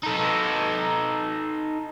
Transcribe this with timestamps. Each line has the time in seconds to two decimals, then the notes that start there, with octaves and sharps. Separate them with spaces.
0.03 D#4 A4